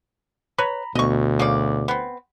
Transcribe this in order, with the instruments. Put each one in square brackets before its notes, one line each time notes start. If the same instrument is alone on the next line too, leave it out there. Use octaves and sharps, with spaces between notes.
[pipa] B4 C#5 [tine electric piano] A#5 B5
[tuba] D2 [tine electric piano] B2 [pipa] D#5 C#6
[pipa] C#3 A#3 D5
B3 C4